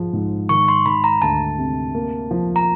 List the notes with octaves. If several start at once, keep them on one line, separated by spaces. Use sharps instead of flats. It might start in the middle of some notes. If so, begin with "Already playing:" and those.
Already playing: G#2 F3 G#3
G#2
D#3 C#6
C6
D#3 B5
A#5
D2 A5
C3
A#3
F3
A#5